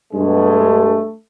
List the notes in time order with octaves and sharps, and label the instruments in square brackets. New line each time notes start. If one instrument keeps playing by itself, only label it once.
[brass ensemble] G2 B2 G#3 [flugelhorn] A3